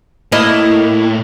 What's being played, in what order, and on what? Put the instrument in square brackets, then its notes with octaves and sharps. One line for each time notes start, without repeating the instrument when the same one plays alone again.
[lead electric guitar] A2 [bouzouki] A#3 E4 D#5